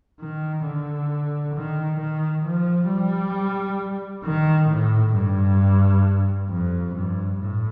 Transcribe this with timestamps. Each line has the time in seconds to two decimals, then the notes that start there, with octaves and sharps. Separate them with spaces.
0.20 D#3
0.65 D3
1.55 D#3
2.00 D#3
2.45 F3
2.90 G3
4.24 D#3
4.70 A2
5.15 G2
6.49 F2
6.95 G2
7.40 A2